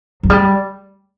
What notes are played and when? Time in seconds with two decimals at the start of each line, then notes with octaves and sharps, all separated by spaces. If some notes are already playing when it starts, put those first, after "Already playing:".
0.23 F#3
0.30 G3